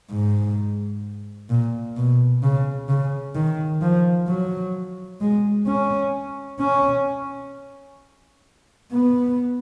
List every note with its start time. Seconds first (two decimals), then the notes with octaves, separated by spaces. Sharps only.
0.10 G#2
1.50 A#2
1.96 B2
2.42 C#3
2.89 C#3
3.35 D#3
3.81 F3
4.28 F#3
5.21 G#3
5.67 C#4
6.59 C#4
8.92 B3